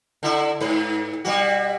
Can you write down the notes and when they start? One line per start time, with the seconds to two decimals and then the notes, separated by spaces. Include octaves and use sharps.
0.23 D3 E4
0.61 G#2 B4
1.25 B2 G3 F#4